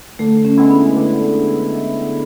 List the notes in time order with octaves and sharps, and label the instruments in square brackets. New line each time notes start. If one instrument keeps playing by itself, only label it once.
[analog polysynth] D3 [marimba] A3
[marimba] C#4
[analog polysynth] G#3 B3 E4
[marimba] D4
[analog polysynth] D3